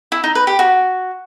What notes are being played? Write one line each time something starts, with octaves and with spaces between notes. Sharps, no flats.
E4
D#4
B4
G4
F#4